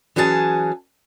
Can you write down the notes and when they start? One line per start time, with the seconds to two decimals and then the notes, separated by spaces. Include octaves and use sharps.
0.16 E3 F#3 C#4 G#4 A5